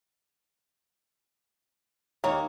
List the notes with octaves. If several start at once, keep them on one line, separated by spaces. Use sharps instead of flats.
D#2 A#3 C#5